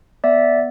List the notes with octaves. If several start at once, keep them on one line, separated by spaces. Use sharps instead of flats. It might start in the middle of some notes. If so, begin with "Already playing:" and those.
B3 D5 E5